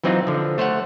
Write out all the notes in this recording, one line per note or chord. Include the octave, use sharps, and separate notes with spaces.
E3 F#3 C4 D#4 F4
D3 F3
A3 C5 C#5 F#5